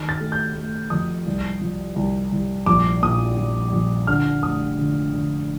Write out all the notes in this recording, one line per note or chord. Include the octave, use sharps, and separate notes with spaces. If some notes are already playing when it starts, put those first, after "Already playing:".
Already playing: D#3 F6
A6
A3
G6
A3
F2 D#6
C2
F3
C2
C2
A#1 D6
A#2 D#6
F3
A#1
D3 F6
F1 D#6
D3
D3